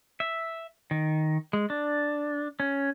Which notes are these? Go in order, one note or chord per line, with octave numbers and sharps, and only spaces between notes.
E5
D#3
G#3
D4
C#4